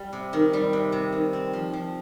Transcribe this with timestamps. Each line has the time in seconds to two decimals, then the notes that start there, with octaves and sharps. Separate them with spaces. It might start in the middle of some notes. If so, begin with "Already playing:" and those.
Already playing: G3
0.13 C3
0.33 D#3
0.53 G3
0.73 C3
0.92 C3
1.12 D#3
1.33 C4
1.53 F3
1.73 F3